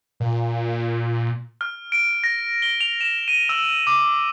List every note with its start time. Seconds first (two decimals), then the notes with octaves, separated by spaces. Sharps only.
0.20 A#2
1.61 F6
1.92 D7
2.24 A#6
2.62 G7
2.80 F7
3.01 E7
3.28 D#7
3.49 E6
3.87 D6